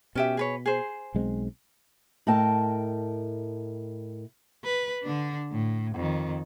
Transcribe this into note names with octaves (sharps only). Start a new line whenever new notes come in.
B2 C#4 G4 E5
G#4 B4 C#5
G#4 C5
B1 G#3 C4
A2 A#4 D#5 G5 A5
B4
D3 D4
A2
F2 D#3